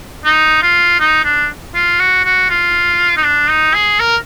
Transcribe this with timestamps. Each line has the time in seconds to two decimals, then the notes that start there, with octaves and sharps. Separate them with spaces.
0.25 D#4
0.63 F4
1.00 D#4
1.24 D4
1.75 F4
2.00 F#4
2.25 F#4
2.50 F4
3.17 D#4
3.25 D4
3.50 D#4
3.74 G#4
4.00 A#4